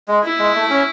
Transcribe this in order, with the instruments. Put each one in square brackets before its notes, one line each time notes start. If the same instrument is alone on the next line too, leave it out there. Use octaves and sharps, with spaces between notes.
[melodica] G#3
[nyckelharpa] E4
[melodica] G#3
A3
C#4